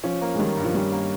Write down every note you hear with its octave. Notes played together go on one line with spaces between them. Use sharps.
F3 C#4
A#3
G#3
D#3 G3
G2
F3
G3 C#4
A#3